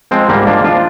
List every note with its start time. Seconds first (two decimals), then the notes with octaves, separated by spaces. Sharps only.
0.11 F3 G#3 C4
0.29 G#2 G3 A#3
0.47 F3 A#3 D4
0.64 F3 D4 F4